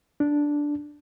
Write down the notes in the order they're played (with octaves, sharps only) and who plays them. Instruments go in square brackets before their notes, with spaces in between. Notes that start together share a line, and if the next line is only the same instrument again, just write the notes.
[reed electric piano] D4